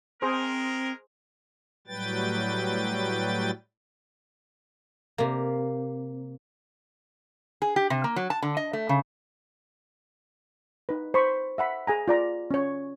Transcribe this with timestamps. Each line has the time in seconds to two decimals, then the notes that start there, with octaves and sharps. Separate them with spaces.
0.22 G#3 C4 G#4 A#4 C5
1.88 A2 F#3 G3 B4 G5 A6
5.18 C3 A#3
7.62 G#4
7.76 G4
7.90 C3
8.04 A#3
8.16 F#3
8.30 A5
8.42 D3
8.57 D#5
8.73 A3
8.89 C#3
10.89 D#4 B4
11.14 C5 B5 C#6
11.58 E5 F#5 B5
11.87 G#4 G#5 A#5
12.08 F4 D5 A#5 D6
12.51 C#4 C#5